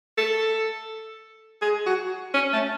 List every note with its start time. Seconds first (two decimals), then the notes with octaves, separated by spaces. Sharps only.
0.18 A4
1.61 G#4
1.86 F#4
2.34 C#4
2.53 A3